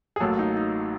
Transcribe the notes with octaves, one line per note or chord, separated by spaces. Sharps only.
G#4
A1 A2 F#3 A#3 A4
D#4
D#4